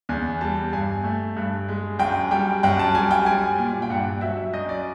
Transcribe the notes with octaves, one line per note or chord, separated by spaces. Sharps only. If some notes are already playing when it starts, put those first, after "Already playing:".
E2 G#5
G3 A5
G2 G#5
A3
G2
G#3
F#2 G5
G3 G5
F#2 G5
A5
G3 G#5
G5
G3 G#5
A#2
G5
G2 F#5
F#3 E5
F#2 D#5
D5